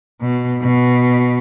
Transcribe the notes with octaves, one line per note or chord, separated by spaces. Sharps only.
B2
B2